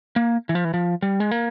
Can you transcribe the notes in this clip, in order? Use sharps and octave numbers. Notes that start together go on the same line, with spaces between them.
A#3
E3
F3
E3
F3
G3
G#3
A#3